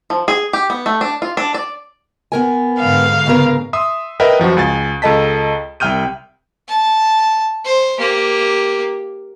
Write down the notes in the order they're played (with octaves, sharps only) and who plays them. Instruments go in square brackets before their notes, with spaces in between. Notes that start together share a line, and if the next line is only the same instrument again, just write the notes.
[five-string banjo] F3
G#4
G4
B3
A3
D4
F4
D4
D5
[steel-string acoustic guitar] B3 A#4 G#5
[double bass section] G#2 D3 [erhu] F5
[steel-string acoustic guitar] C#3 B3 A#4
[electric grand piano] E5 C6 D#6
A#4 B4 D#5 E5 F#5 G5
F#2 F3 F4 F#4
C#2 G#5 A6
C#2 A4 D#5 A5 B6
C2 E5 G5 F6 G6 D#7
[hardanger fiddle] A5
C5
A#3 G4